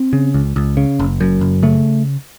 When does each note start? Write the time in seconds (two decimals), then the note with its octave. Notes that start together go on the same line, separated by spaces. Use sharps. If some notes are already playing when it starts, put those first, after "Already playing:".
Already playing: C4
0.13 C#3
0.34 C#2
0.56 C#2
0.77 C#3
0.99 F#1
1.20 F#2
1.41 F#1
1.63 C#3 A3